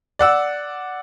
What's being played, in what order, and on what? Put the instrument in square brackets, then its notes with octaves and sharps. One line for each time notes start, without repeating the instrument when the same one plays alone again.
[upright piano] D5 F#5 E6